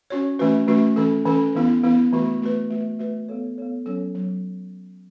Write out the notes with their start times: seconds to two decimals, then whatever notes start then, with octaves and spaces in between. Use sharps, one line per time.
0.10 C#4 F#4 C#5
0.39 E3 A3 C#4 F#4 B4
0.68 E3 A3 C#4 F#4 B4
0.96 E3 C#4 A4
1.25 E3 C#4 A4
1.55 E3 B3 E4
1.84 E3 B3 E4
2.13 E3 A3 F#4 B4
2.42 E3 A3 F#4 B4
2.70 A3 F#4 B4
2.99 A3 F#4 B4
3.29 B3 A4 C#5
3.58 B3 A4 C#5
3.86 F#3 C#4 A4 C#5
4.15 F#3